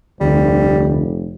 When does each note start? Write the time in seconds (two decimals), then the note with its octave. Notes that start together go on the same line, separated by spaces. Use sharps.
0.20 F1 D2 G3